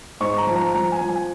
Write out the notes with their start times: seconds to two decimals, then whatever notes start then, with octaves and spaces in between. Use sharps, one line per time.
0.20 G#2 C#6
0.38 A#5
0.47 F3
0.56 A#5
0.74 F3 A#5
0.92 G#5
1.01 F3
1.09 G#5